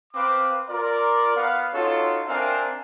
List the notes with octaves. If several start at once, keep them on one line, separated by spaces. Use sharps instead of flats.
C4 B4 F5 D6
F4 A#4 D5
B3 F5
C#4 D#4 F4 F#4 A4 C#5
C4 D4 A#4 E5 F5 G#5